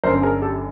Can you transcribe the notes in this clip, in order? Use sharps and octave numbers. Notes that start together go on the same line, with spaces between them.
G1 F#2 D3 A#4 C5
G#4 A#4
G4 A4